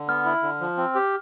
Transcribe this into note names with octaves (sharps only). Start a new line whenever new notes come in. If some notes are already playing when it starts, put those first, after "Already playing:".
Already playing: D3
B3 F6
E4
D3
F3
C4
G4